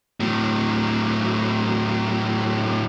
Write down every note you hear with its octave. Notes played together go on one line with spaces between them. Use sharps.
A2 F#3